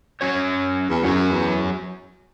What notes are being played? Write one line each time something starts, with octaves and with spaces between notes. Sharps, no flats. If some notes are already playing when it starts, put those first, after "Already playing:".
F#3 C#4 F#4 C#5
E2
F#2 F#3 C#4 F#4 C#5
E2